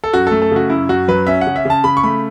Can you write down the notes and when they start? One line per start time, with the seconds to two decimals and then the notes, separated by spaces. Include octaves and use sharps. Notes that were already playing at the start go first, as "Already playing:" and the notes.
0.04 A4
0.13 F#2 F#4
0.27 A3 A4
0.42 A4
0.51 C#3 F#4
0.70 F#2 E4
0.89 F#2 F#4
1.08 F#3 B4
1.27 C#4 E5
1.41 F#5
1.47 C#3
1.56 E5
1.65 C#3 A5
1.84 C#3 B5
1.97 C#6
2.04 A3 B5